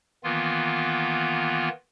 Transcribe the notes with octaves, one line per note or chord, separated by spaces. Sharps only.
D#3 E3 A#3 B3 F4